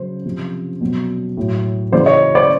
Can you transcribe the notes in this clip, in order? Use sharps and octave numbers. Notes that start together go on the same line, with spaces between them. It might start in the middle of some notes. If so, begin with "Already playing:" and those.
Already playing: C#3 F#3 C5
C3 F3
B2 F#3
A2 F#3
C#3 E3 C5 D5
C#5 D#5
C5 D5